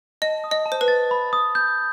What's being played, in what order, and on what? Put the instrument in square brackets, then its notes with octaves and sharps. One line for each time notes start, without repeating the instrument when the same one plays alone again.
[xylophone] D#5 [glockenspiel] A5
[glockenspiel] D#6
[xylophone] D#5
[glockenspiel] A5
[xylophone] C5
B4
[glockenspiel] A6
B5
D#6
G6